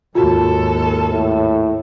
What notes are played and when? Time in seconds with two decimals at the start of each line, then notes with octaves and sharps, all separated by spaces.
0.15 D#2 G#2 F4 F#4 A4 A5
1.12 A2